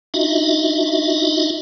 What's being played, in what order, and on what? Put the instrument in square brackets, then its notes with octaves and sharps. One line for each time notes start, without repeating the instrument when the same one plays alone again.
[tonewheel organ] D4 D#4 F4 F#4 D#5 E5